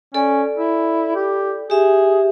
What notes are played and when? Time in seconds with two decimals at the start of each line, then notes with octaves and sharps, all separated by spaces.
0.14 C#4 A4 D5
0.57 E4
1.16 G4
1.70 G4 G#4 E5